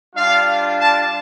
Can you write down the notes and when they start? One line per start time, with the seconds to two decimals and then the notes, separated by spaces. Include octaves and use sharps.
0.14 G3 D4 F4 F5
0.79 A5